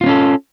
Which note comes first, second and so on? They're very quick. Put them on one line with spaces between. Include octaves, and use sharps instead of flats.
F4 C4 C#4 A4